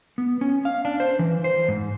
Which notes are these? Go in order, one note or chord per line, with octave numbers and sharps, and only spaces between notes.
B3
C#4
F5
D4
C5
E3
C5
G#2